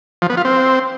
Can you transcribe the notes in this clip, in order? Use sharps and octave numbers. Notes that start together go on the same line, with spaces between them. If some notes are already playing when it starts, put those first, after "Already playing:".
F3
B3
F4
C4